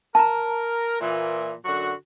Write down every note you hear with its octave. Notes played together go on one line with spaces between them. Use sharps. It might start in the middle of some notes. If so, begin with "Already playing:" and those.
A#4 A5 A#5
A#2 E3
F#2 D3 F#4